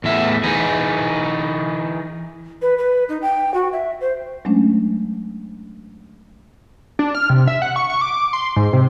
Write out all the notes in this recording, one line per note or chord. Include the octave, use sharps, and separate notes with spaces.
E2 A2 E5
E3 D#4 G#4
B4
B4
D#4
G5
F#4
E5
C5
F#3 G#3 A3 C#4 D4
D4
F6
C3
E5
F#5
C#6
C#6
D6
C6
G#2
C3